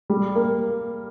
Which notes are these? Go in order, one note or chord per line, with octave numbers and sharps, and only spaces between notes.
G3
A#3